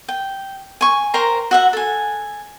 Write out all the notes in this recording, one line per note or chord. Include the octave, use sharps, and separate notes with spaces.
G5
G#5 C#6
A#4 C5 G5 A#5
F#4 E5 F#5
A4 G#5